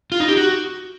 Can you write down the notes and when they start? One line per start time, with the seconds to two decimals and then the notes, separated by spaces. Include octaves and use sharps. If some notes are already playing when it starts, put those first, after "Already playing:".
0.12 F4
0.20 D#4
0.28 G4
0.37 F#4